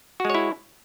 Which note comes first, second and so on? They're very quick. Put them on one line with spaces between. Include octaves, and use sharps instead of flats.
F#4 G#3 C#5 E4